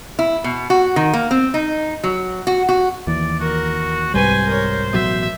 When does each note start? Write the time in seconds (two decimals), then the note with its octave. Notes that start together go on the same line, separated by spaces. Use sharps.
0.19 E4
0.44 B2
0.70 F#4
0.96 D#3
1.13 A#3
1.31 C4
1.54 D#4
2.04 F#3
2.47 F#4
2.69 F#4
3.07 D#2 E3 D5
3.40 F#4 A#4
4.14 C2 G#2 G3 B4 C5 G#5
4.47 A#4 C#5
4.93 A1 B2 F#3 E5